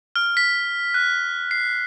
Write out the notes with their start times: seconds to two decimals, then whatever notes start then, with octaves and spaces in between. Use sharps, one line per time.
0.16 F6
0.37 B6
0.94 F#6
1.51 C7